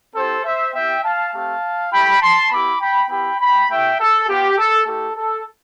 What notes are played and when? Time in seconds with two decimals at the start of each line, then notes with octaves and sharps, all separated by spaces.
0.15 C4 E4 G4 A4 C5
0.44 C5 E5
0.74 B3 E4 G4 E5 G5
1.03 F5 A5
1.33 A3 C4 G4 F5 A5
1.92 A3 E4 G4 G5 B5
2.21 A5 C6
2.51 B3 E4 G4 B5 D6
2.80 G5 B5
3.10 B3 E4 G4 G5 B5
3.40 G5 B5
3.69 A3 E4 G4 E5 G5
3.99 A4
4.28 B3 F4 G4
4.58 A4
4.86 A3 E4 G4 A4
5.16 A4